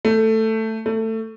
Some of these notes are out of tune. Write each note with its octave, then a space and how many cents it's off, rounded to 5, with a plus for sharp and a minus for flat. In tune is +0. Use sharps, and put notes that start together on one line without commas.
A3 +10
A3 +20